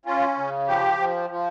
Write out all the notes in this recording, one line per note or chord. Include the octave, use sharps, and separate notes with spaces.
C#4 F4
C#3
F3 G4
F3
F3